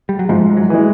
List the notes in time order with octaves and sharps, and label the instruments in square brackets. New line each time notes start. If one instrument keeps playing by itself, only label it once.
[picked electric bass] G3
F#3
[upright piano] G#2 [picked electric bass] F3
[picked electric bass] F#3
[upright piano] E3 G#3